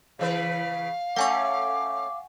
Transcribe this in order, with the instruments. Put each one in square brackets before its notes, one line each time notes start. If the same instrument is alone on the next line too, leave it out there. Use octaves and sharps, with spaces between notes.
[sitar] C#3 E3 B4 [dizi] F5
[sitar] A3 C#4 [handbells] F#5 G#5 C#6 [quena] D6